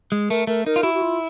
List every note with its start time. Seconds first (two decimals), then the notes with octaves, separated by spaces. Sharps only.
0.12 G#3
0.30 A3 A#4
0.47 A3 A#4
0.66 D#4 A#4
0.76 F4
0.83 E4 F#4
0.94 F#4
1.02 F4